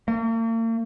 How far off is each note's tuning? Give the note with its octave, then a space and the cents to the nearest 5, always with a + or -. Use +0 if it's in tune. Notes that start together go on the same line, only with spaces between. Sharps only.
A#3 -45